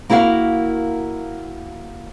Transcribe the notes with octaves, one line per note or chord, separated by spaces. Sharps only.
A#3 E4 F#4 A#4 F5